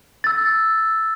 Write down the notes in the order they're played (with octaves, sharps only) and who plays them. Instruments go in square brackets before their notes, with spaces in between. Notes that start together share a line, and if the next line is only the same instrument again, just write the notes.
[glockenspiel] E6 A6